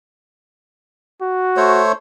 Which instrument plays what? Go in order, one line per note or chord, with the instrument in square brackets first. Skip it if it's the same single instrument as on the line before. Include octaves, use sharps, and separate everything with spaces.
[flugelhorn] F#4
[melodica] A3 C5 C#5